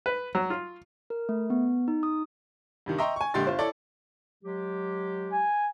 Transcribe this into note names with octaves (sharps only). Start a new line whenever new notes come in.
B4
F#3
F4
A#4
A3
B3
D#4
D#6
G2 C3 D#3
D#5 E5 G5 A#5 C6 C#6
G#5 C#6
A#1 D3 G#3 G4 C6 A6
G1 F4 C5
E4 A4 C#5 D5
F#3 G#3 G4
G#5